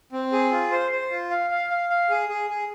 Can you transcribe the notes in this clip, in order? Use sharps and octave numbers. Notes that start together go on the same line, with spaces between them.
C4
G#4
F4
C5
C5
F4
F5
F5
F5
F5
G#4
G#4
G#4